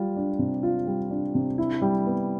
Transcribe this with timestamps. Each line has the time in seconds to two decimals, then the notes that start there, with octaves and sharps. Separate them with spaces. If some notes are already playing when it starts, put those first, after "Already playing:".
Already playing: G3 F4
0.16 D4
0.39 C3
0.63 F4
0.87 G3
1.11 D4
1.35 C3
1.58 E4
1.82 G3
2.06 B3